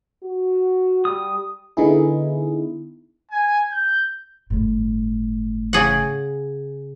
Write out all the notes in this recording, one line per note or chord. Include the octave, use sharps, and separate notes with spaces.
F#4
G3 D#6
D3 B3 D#4 E4 G#4
G#5
G6
G1 A2
C#3 G#4 F#5